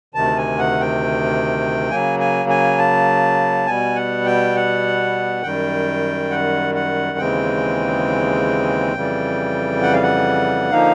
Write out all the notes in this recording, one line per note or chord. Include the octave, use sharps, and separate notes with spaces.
D2 C3 D#3 A5
G#5
F#5
G5
C#3 F#3 A#3 G#5
G#5
G#5
A5
B2 G3 B3 G#5
F#5
G5
F#5
F#2 D#3 G3 G5
F#5
F#5
D#2 C#3 E3 G#3 C4 G5
F2 C#3 E3 G3
F#5
F5
F#5
D3 F3 A#3 D#4 F5